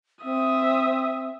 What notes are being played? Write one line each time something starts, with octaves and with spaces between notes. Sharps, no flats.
C4 E5 D#6